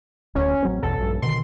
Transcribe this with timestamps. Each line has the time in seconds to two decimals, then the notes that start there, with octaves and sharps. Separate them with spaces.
0.35 D1 D2 C#4
0.63 A1 F#3 C4
0.83 A1 E2 B2 A4
0.97 A#1 G2
1.22 B2 D3 D#3 C6